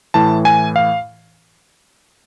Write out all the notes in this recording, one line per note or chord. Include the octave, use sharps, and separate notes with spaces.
A2 E3 A5
G#5
F5